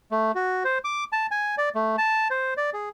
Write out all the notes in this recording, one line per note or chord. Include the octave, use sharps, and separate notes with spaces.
A3
F#4
C5
D6
A5
G#5
D5
A3
A5
C5
D5
G#4